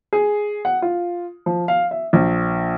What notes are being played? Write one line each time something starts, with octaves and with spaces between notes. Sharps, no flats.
G#4
F#5
F4
F3
F5
E5
A#1